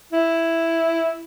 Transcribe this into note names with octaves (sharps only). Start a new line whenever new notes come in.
E4